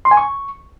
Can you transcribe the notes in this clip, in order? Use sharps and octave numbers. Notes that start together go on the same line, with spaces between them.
C6
G#5
C#6